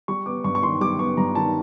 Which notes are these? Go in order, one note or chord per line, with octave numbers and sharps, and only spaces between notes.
G3 C#6
B3 D6
G2 C#6
C#6
D#3 C6
G3 D6
B3 C#6
G2 A#5
D#3 A5